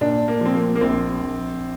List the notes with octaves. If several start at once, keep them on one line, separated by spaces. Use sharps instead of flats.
A#2 D4
A#3
F3 C4
A#3
A#3
A#1 C4
A#1